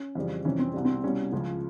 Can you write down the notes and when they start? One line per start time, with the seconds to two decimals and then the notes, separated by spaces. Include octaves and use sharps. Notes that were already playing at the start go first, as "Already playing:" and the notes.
Already playing: C#4
0.15 F2 C#3 E3 G3
0.44 F2 C3 E3 G3 C#4
0.59 C4
0.74 C2 B2 G3
0.85 C4
1.04 C2 B2 G3 C#4
1.32 C#2 C#3 F3